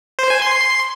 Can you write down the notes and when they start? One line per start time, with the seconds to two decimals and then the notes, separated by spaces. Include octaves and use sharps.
0.19 C5
0.30 G#5
0.42 C6